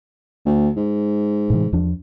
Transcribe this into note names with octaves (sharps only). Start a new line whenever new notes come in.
D2
G#2
A2 C3 E3
E2 F3 D4